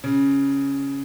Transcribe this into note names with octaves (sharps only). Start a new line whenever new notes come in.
C#3